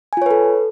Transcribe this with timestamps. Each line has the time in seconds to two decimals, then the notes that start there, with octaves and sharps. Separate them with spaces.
0.13 G#5
0.17 F4
0.22 C#5
0.26 B4
0.31 A4